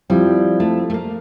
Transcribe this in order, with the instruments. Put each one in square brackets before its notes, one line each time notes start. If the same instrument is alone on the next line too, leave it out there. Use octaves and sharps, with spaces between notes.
[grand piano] F3 C4 E4 [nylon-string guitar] G3
[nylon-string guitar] A3
A3
A#3